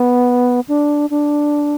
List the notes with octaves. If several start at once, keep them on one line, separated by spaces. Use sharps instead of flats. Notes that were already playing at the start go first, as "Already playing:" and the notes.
Already playing: B3
D4
D4